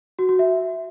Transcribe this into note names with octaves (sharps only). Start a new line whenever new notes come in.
F#4
F#4
E5